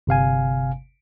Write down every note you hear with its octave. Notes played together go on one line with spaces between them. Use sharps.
G1 C3 F5 G#5